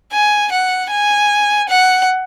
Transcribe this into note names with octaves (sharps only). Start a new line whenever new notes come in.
G#5
F#5
G#5
F#5